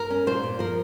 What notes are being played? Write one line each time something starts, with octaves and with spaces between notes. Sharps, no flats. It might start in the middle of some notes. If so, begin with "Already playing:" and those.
Already playing: A#4
C#4
A#2 C5
A#2
F3 A#4